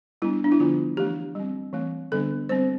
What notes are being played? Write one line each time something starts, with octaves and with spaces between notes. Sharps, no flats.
G3 B3 D4 E4
D4
E4
D3 F3 B3 D4 F4
E3 A3 D4 G4
G3 C4
E3 A3 C4
D3 G3 B3 D4 A4
G3 C4 C5